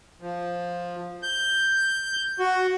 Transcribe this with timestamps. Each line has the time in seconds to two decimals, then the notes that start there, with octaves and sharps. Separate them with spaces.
0.21 F3
1.23 G6
2.39 F#4